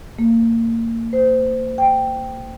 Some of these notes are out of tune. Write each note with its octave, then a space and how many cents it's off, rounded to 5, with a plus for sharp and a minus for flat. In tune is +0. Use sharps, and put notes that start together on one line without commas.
A#3 -30
C5 -20
G5 +0